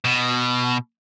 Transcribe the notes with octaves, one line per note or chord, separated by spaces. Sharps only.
B2